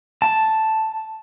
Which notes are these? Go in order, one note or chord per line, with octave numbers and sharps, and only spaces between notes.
A5